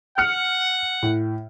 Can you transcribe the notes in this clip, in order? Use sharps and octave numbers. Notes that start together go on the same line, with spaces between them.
F#5 F6 C#7
A2